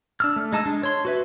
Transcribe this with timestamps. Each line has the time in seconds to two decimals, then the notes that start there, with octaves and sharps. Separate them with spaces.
0.20 D4 E6 F6
0.36 A3
0.52 G#3 D#4 A5 D#6 E6
0.66 G#3 D4
0.83 C#5 C6
1.05 F#4 B4 E5